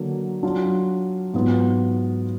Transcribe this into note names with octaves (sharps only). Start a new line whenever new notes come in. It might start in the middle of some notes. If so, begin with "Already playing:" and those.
Already playing: D3 F#3 A#3
F#3 D4 F4
G#2 F#3 B3 F4